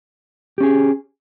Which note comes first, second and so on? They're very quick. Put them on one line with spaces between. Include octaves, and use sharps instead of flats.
G4 C#4 G#4